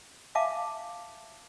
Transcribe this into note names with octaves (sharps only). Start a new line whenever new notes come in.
E5 F5 A5 D6